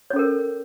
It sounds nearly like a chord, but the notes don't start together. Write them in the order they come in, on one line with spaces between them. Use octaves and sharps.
C#5 C#4 A4 A#4